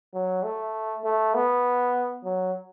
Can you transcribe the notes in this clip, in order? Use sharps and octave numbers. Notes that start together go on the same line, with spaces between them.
F#3
A3
A3
B3
F#3